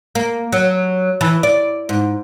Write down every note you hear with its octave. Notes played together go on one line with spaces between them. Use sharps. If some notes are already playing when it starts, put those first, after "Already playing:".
A#3
F#3
E3
D5
G#2